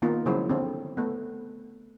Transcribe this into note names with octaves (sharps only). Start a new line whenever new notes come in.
D#3 A#3 B3 D#4 F4
C#3 F3 F#3 G#3 E4 C5
D3 C4
A3 B3